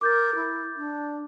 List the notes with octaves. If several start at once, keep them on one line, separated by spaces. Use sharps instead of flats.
A#4 D6 G6 A6
E4
D4